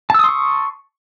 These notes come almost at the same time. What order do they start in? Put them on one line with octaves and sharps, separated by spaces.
A5 E6 D#6 C6 C#6